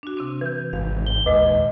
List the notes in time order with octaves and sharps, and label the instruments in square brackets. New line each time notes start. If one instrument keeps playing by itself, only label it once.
[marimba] D4 F#4
C3 C4 D4
[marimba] E3 [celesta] B4 G6
[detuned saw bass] G#1 [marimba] F5
[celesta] G7
[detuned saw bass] D#2 [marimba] A#2 G#3 D#6 [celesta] B4 D#5